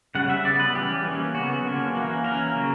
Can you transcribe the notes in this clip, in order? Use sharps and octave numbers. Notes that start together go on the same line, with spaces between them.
C#3 G3 C#4 F#5
E5
C#3 G3 B3 D5
B4
E3 G3 C#4 G4
E3 A#3 C#4
C#3 F#3 B3 F#4
D3 F#3 A#3 C#4
E3 A#3 C#4
E3 A#3 C#4 A#4
C#3 F#3 A#3